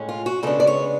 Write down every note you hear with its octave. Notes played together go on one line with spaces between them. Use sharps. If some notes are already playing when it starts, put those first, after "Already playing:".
Already playing: A2 G#3 C#4
F4
F#4
C#3 G#3 B3 D4 A4
D5
C#5